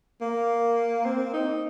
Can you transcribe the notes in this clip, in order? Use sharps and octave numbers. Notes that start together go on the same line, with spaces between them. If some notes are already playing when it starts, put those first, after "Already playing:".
A#3
C4
D#4